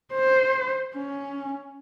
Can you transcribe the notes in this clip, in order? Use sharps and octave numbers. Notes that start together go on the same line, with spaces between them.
C5
C#4